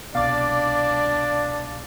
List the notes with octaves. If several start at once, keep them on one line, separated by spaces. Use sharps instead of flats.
C2 B2 D4 D5 F5 D6 A6